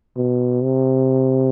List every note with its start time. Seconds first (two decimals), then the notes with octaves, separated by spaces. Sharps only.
0.16 B2
0.64 C3